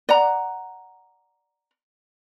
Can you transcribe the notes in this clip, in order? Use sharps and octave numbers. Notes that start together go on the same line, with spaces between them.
D5 F#5 A#5